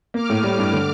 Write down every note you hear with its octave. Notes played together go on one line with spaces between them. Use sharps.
A#3 D6 F6
A2
G3
G2
D3